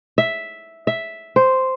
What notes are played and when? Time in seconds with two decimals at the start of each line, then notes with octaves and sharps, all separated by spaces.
0.18 E5
0.87 E5
1.36 C5